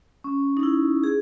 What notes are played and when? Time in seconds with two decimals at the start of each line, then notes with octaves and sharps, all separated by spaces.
0.24 C#4
0.57 D#4
0.63 E4
1.04 G#4